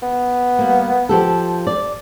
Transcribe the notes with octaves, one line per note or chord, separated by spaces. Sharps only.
B3
G3 A#3
F3 G4 A4
D5